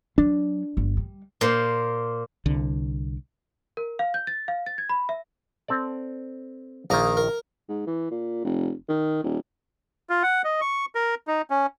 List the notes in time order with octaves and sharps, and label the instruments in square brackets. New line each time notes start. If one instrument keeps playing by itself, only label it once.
[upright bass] F#3 [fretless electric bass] D4
[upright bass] G1
G3
[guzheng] A#2 C5
[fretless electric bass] C2 D3
[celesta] A#4
F5
G6
A6
F5
A6
G#6
B5
E5
[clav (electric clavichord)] C4 A4 D5
[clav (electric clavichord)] A#1 D#3 [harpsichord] A#3 D#5 A#5
[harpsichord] A#4
[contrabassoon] G#2
E3
A#2
F1
D#3
D#1
[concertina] F4
F#5
D#5
C#6
A#4
D#4
C#4